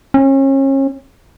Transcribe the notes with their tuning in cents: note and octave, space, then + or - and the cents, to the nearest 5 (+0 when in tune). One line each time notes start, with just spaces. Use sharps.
C#4 -35